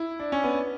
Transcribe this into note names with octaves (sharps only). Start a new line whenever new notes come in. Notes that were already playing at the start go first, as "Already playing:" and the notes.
Already playing: E4
D4
C#4
B3